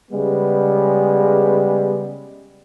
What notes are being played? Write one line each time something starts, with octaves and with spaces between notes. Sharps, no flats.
C#3 G3 G#3 B3